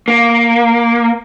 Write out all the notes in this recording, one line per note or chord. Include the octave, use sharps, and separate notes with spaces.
A#3